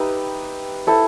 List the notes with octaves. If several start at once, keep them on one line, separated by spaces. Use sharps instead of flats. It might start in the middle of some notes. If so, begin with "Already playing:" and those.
Already playing: D#4 G4 B4 E5
E4 A4 C5